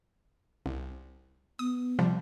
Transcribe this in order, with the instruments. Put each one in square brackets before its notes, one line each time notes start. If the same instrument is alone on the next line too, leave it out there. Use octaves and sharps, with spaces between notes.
[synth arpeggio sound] C2
[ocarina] B3 [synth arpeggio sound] D#6
[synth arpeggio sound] C3 F3 G3